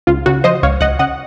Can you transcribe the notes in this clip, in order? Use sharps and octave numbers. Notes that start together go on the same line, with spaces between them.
C#2 F4
C#3 F#4
F3 C5 D#5
C#2 C#5 F5
C#2 D#5 F#5
C#3 D#5 F#5